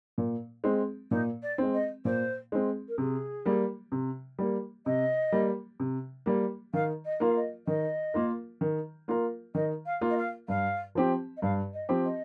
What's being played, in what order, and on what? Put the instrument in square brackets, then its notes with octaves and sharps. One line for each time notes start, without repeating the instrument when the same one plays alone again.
[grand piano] A#2
G#3 C4
[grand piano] A#2 [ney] D#4
[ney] D5
[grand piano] G#3 C4
[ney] D#5
[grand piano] A#2 [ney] C5
[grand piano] G#3 C4
[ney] A#4
[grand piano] C3 [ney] G#4
[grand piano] G3 A#3
C3
G3 A#3
[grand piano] C3 [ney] D#5
[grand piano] G3 A#3
C3
G3 A#3
[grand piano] D#3 [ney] F5
[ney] D#5
[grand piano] A#3 F4 A#4
[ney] F5
D#5
[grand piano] D#3 [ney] D#5
[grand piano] A#3 F4 A#4
D#3
A#3 F4 A#4
[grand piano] D#3 [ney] D#5
[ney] F5
[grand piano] A#3 F4 A#4
[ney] D#5
F5
[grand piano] G2 [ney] F5
[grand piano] F3 C4 G4
[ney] D#5
[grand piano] G2 [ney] F5
[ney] D#5
[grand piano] F3 C4 G4
[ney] D#5